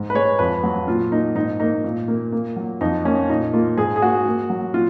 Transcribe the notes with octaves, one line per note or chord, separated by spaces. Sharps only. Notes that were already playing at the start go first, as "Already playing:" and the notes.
Already playing: G#2
B4
G#3 C#5
F2 B4
F#3
A#2 F4
A#3 D#4
G#2 D#4
A#3 D#4
A#2
A#3
A#3
F#3
F2 D#4
A#3 C#4
A#2 D#4
A#3 F4
G#2 G#4
G#4
A#3 F#4
A#3
F#3
A#2 F4